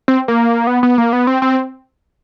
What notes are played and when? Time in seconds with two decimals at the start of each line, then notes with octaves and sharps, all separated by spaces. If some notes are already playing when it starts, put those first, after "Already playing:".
0.08 C4
0.28 A#3
0.67 B3
0.83 B3
0.98 A#3
1.13 B3
1.27 C4
1.42 C4